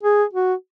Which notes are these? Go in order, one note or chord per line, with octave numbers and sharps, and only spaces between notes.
G#4
F#4